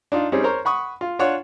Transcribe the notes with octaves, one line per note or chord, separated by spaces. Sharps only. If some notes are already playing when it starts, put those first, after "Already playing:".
D4 D#4 F4
G3 C4 C#4 D#4 G#4
A#4 C5 C#5 A#5
F#5 B5 C#6 D#6
F4
D4 F4 C#5 F#5 C#6